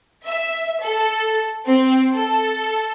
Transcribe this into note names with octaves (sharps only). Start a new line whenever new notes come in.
E5
A4
C4
A4